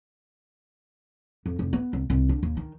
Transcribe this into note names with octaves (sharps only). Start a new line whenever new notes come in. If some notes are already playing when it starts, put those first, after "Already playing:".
F2
F1
B3
C2
C2
D3
D#2
D#3